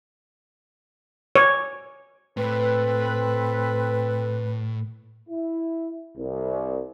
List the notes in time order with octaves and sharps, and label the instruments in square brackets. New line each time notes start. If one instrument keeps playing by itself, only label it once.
[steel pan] C#5
[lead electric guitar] A2 [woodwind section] C4 A4 B4
[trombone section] E4
C2